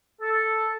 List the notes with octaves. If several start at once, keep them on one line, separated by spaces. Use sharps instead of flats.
A4